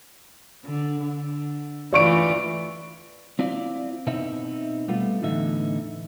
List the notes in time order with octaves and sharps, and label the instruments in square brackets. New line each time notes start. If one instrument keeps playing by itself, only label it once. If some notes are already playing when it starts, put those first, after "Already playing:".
[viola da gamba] D3
D3
[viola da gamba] E3 A3 F4 [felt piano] D5 C#6 D7
[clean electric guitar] C4 E4 F4 D5
B2 B3 C4 D#4 E5
G3 A3 B3 F4
E2 A2 D3 E3 D#4 E5